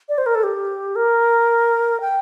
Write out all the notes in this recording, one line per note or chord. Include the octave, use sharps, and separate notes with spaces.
D5
C5
A#4
A4
G4
A#4
G5